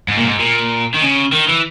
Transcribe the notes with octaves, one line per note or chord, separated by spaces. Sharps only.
G#2
A#2
G#2
A#2
D#3
C#3
D#3
E3